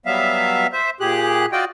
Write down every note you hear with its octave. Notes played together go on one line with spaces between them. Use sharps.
F#3 G3 B3 E5 F5
C5 E5
A#2 G4 G#4 F#6
F4 F#4 D5 D#5 G5